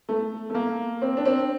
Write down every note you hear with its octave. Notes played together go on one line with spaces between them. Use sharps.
A3
A3
A#3
C4
D4
C4